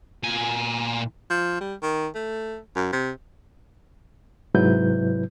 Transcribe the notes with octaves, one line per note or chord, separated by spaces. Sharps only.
A#2 G#5
F3
G3
D#3
A3
F#2
C3
G#2 C3 F#3 E4 B4 G6